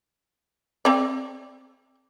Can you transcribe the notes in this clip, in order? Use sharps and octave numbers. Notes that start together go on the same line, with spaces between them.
C4 D5